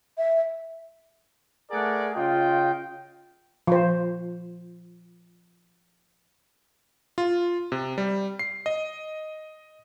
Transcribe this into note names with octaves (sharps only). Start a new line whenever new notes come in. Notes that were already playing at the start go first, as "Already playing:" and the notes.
E5
A3 G#4 A#4 D5 F#5
C#3 F4 D#5 G5
F3 C5
F4
C3
G3
C7
D#5